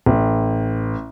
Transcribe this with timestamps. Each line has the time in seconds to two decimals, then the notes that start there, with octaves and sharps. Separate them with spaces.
0.06 A1